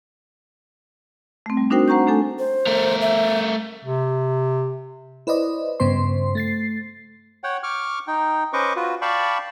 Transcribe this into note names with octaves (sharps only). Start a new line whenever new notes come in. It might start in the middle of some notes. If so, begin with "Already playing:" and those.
A3 C4
G3
D4 D#4 F#4 A#4 C5 G5
C5 F#5 A#5 C#6 G6
A3 D4 A4 G#5
C5
A3 A#4
E5
C3
E4 B4 C5 D5 D#5
G2 C#3 B3 C5 C6
A3 A6 C7
C#5 F#5 G5
C#6 D6 F6
D#4 G5
C#4 B4 C5 D#5 C#6 D6
F4 F#4 B4
D5 F5 G5 A5 B5 C#6